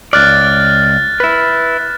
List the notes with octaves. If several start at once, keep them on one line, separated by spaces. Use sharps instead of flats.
C#2 D5 F6 F#6 A6
E4 B4